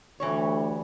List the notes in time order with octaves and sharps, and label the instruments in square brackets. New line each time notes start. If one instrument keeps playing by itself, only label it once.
[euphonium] D2 [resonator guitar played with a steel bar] E3 G3 C#5